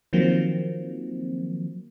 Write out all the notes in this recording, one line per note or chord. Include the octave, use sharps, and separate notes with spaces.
D#3 F3 F#3 A#3 C4